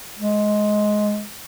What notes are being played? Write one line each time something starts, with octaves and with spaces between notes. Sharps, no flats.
G#3